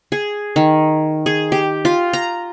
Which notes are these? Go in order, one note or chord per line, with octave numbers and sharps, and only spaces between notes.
G#4
D#3
G#4
G4
F4
A#5